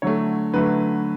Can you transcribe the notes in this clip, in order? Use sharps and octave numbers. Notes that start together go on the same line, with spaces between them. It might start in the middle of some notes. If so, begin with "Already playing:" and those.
D3 F#3 A3 C#5
D3 F#3 A3 B4